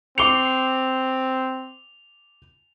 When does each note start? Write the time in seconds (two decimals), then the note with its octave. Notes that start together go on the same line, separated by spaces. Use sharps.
0.18 C4 D6 C7 C#7 F7 G7